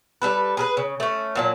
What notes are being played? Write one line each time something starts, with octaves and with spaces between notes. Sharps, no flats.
G3 A4 B4
G#4 A#4 B4
C#3
A3 C#4
A#2 F#3 A5